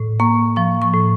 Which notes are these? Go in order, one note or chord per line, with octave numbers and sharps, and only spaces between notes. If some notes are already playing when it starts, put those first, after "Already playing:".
Already playing: A2
A#3 C#6
F3 C#6
C#6
A2